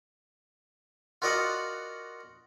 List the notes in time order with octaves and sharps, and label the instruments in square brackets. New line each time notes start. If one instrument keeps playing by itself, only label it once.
[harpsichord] F4 F#4 A#4 D5 D#5 F#5